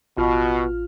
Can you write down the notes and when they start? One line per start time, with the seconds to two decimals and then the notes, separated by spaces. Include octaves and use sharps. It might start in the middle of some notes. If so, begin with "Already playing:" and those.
0.18 A1 B2 F4 F6